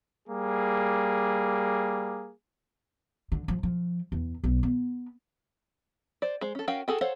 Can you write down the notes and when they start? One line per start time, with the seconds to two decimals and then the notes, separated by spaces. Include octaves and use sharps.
0.28 G3 A#3 G#4
3.32 D3
3.48 F3
3.63 F3
4.12 E2
4.44 B1
4.63 B3
6.22 C5 D5
6.41 G#3 C5
6.55 C#4 A4
6.68 C#4 F#4 A#4 F5 G5
6.88 F#4 G#4 A4 G5
7.01 A4 C5 C#5 F5 F#5